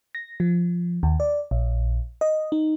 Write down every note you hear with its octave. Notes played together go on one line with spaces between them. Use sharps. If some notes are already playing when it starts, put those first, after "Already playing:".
A#6
F3
D#2
D5
A#1
D#5
D#4